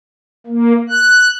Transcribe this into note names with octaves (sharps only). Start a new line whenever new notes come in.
A#3
F#6